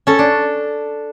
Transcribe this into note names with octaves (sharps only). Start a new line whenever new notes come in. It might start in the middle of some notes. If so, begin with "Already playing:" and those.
C#4 A4
D4